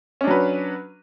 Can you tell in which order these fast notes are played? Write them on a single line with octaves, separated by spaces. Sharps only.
C#4 D4 F#3 B4